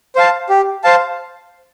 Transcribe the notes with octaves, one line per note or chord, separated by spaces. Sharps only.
C5 F5 A5
G4
C5 F5 A5